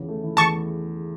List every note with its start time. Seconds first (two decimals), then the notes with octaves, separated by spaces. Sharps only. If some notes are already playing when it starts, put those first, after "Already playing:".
Already playing: E2 C#3
0.08 A3
0.23 E3
0.37 E2 A5 C#6